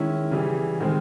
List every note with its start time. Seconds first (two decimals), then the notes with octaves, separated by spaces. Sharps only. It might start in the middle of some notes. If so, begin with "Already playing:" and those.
Already playing: D#3 G#3 C#4 E4
0.31 C#3 E3 G3
0.80 D#3 G#3 C4